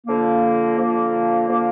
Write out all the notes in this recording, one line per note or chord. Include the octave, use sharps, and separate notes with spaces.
D3 F3 A#3
D3 F3 A#3
D3 F3 A#3